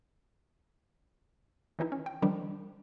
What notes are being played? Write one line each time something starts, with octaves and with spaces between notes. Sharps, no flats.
D#3 E3 D#4 E4
C#4
G5
D#3 F3 G3 D4